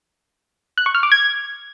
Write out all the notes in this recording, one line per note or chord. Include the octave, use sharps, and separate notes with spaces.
F#6
C#6
F6
D6
G#6